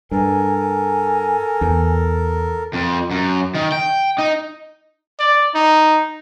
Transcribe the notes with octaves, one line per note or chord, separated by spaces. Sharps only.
G2 A4 A#4 G#5
G#5
E2
F2
F#2
D#3
G5
D#4
D5
D#4